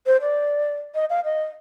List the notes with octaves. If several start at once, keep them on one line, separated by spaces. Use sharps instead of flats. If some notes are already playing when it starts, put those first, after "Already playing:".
C5
D5
D#5
F5
D#5